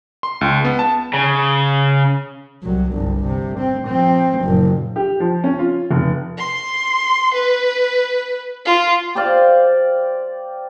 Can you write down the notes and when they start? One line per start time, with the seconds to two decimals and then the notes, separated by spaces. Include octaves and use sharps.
0.23 C6
0.41 C#2
0.65 B3
0.79 A5
1.14 C#3
2.63 C2 F#3
2.91 G1 C2
3.25 C3
3.59 C4
3.88 F3 C4
4.43 F#1 A#2
4.96 G4
5.20 F3
5.44 C#4
5.59 F4
5.91 F1
6.38 C6
7.34 B4
8.65 F4
9.15 G4 C5 D5 F5